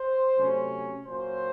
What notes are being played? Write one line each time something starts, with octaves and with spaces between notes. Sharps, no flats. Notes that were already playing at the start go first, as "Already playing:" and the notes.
Already playing: C5
C3 F#3 A3 C#4
A#2 F#3 A#3 C#4 C5